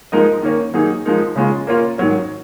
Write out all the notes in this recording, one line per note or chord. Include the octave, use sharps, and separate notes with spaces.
F3 G#3 D#4 A#4 D#5
D#3 A#3 C#4
D#3 F#3 A#3 D#4 G#4
F3 G#3 D#4 A#4
C#3 G#3 C#4 F4
A#3 C#4 F4
G#2 D#3 F#3 C#4